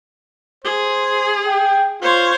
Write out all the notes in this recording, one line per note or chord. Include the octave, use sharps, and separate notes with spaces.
G#4 C5
G5
F4 C5 C#5